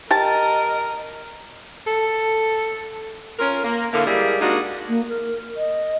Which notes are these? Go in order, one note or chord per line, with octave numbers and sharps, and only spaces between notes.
G4 A#4 D#5 A5
A4
C#4 F4 A#4
A#3
A2 D3 A3 A#3
G3 G#3 A#3 E4 G#4
G#3 A#3 D4 D#4 F#4
A#3
A#4
D#5